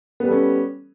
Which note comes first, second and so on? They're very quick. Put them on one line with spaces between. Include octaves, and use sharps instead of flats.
B3 G3 A4 C#4